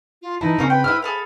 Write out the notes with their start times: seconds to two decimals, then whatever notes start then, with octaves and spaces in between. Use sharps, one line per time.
0.22 F4
0.41 E3 D#4 E4 A5
0.59 C#3 A#3 C4 C#4 G#4
0.70 B4 G5
0.84 E4 C5 E5 G5 F6
1.02 G#4 A4 F5 B5